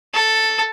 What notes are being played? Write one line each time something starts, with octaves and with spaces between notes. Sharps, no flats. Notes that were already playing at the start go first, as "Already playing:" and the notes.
A4